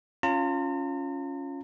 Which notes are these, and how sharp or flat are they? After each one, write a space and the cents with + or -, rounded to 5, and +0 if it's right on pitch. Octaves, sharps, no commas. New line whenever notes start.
C#4 +0 F4 +0 A#5 -45